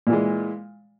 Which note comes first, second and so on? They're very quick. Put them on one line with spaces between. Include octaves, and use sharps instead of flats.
A#2 E3 G#3